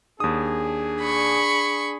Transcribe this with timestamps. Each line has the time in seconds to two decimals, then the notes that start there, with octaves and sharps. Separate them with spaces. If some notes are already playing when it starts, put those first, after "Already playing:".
0.20 D#2 D4 G#4 D#6
1.01 B5 C#6